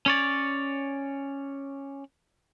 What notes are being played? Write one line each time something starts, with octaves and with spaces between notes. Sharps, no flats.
C#4 C#5 D5